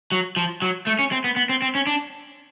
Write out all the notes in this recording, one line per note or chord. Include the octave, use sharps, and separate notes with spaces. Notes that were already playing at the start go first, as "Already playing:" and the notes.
F#3
F3
F#3
A3
C#4
C4
B3
B3
C4
C4
C#4
D4